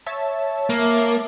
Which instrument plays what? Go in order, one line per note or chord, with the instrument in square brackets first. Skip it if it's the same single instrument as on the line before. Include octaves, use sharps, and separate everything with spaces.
[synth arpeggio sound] C#5 E5 A5
[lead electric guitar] A#3